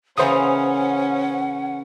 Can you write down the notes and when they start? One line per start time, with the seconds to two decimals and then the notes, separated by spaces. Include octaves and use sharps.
0.18 C#3 E3 A#3 C#4 C5 F#5 D#6